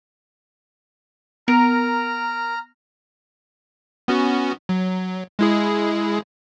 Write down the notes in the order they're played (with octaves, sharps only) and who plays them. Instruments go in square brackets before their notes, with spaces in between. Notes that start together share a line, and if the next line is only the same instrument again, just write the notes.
[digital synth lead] B3 [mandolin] A#4 [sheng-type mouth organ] A#5 F6
[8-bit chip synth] B3 C#4 F#4
F#3
G#3 E4 G#4